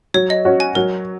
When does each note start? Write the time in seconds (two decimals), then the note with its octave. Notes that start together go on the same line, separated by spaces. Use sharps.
0.14 F#3 C#5
0.30 D#5
0.45 C#4 F#4
0.60 G#5
0.75 F#3 A#4